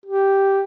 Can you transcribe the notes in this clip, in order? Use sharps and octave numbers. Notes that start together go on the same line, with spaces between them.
G4